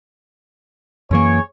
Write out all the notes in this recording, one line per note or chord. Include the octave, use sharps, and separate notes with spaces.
F#2 E3 A#3 G#4 C#5